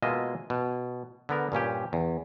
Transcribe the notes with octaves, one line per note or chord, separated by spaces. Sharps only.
B2 G#3 A#3 F4 D#5 E5
B2
D3 B3 A#4
G2 A#2 C#4 G4
E2